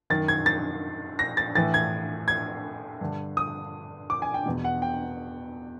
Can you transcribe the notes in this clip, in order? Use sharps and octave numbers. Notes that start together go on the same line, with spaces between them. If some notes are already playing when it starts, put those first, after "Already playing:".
F#2 D#3 A6
G#6
A6
A#6
A6
A2 E3 A6
G#6
G#6
G2 D3
D#6
D6
G#5
G5
E2 B2
F#5
G5